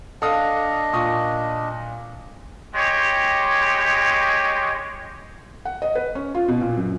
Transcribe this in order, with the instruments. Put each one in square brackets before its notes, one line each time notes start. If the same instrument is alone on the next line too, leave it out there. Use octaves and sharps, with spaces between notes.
[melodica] D4 D#5 [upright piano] A4 F5 D#6
[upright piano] A#2 C#6 D#6
[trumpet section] G#3 G4 C#5
[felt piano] F#5
D#5
B4
C#4
F4
B2
A#2
F#2